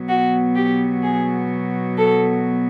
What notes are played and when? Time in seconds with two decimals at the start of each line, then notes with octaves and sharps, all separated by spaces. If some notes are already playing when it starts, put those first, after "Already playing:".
Already playing: B2 F#3 B3
0.09 F#4
0.55 G4
1.03 G#4
1.98 A4